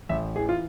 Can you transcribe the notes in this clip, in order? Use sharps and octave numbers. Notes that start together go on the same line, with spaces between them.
A1 E5
E3 G#4
F4